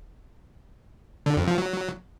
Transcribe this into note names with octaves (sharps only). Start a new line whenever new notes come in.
D3
F2
F3
F#3